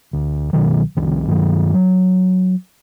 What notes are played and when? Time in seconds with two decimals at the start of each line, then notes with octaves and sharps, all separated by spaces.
0.13 D2
0.53 C2 B2 D#3 F#3
0.97 F#1 C2 D#3
1.27 G2 D#3 F#3
1.74 F#3